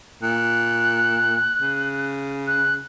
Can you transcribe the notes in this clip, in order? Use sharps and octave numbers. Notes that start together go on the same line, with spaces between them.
A#2 F#6
C#3
F#6